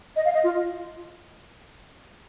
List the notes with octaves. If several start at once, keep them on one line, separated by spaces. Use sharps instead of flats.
D#5
F5
D#5
F4